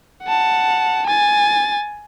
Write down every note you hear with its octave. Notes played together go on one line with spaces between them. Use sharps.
F#5 A5
G#5 A6